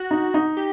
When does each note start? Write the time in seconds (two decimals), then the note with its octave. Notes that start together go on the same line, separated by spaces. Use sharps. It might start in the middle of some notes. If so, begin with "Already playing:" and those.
Already playing: F#4
0.11 D#4
0.34 D#4
0.57 G4